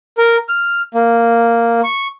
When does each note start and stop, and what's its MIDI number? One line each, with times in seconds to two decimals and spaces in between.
0.18 0.37 70
0.49 0.81 89
0.95 1.81 58
1.84 2.07 85